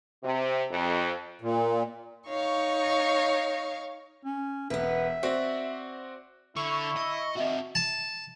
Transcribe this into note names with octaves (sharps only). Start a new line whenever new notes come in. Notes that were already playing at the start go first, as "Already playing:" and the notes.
C3
F2
A#2
D#4 C#5 F5 C#6
C#4
E1 B3 B4 E5
C4 F#4 D5
D3 E4 C#6
D#5
C4 F#4 D#5 E5
A5